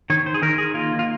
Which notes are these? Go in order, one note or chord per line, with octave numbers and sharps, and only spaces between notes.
D#3 C#5
C5
G#4
D#3 A#4
G#4
A#3 F4
F4